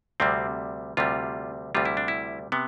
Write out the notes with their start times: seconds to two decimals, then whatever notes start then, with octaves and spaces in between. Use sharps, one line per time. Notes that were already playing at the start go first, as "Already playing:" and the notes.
0.20 D2 C3 G3 C4
0.97 D2 C3 G3 F4
1.75 D2 C3 G3 F4
1.85 E4
1.97 D4
2.08 E4
2.52 C3 B3